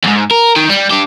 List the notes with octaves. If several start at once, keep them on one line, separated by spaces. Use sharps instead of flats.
E2 G#2
A#4
D#3
G3
D4 G4